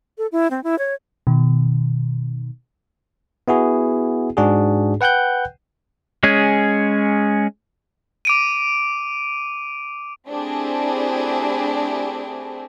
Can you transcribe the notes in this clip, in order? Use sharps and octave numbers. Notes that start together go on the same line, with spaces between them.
A4
E4
C4
E4
C#5
B2 D#3
B3 E4 F#4 G#4
G#2 D4 F#4 G#4
B4 F#5 G5 F#6 G6
G#3 C#4 G#4
D6 D7 D#7
A3 C4 D4 E4 G4 G#4